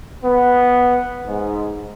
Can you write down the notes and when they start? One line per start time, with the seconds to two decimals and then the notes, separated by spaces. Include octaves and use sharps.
0.24 B3
1.26 G#2